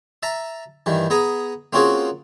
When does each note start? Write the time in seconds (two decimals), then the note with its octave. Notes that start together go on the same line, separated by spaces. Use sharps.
0.23 E5 A5 A#5
0.86 G2 D#3 E3
1.10 B3 G#4 A#5 D#6
1.73 A#3 C4 C#4 F4 F#4 G#4